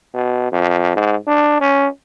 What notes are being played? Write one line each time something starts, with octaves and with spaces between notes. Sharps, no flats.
B2
F2
G#2
D4
C#4